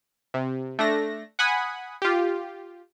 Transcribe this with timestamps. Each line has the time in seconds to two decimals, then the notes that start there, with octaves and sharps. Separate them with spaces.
0.34 C3
0.79 A3 D4 A#6
1.39 F#5 G#5 B5 D#6
2.02 F4 G4